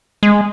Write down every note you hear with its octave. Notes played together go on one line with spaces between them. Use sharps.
G#3